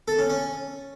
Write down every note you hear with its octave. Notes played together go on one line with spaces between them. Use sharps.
A4
C#4
C#4